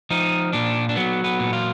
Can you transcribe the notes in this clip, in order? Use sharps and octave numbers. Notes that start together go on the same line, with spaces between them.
F3 D#4
A#2 D4
D4
F#3 B3
B3
A#2
F4